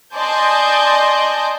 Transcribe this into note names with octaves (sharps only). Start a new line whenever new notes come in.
D5 D#5 G#5 A5 C6 G6